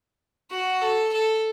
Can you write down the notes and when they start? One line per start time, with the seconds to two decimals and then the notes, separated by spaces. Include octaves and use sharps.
0.51 F#4
0.82 A4
1.13 A4